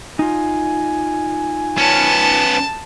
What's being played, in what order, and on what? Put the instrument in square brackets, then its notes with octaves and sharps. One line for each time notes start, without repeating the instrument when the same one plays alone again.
[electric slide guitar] D#4 F4 [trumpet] G#5
[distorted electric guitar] B3 C#4 [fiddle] A5